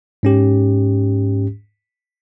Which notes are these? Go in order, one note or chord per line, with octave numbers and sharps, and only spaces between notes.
G#2 C#4 G4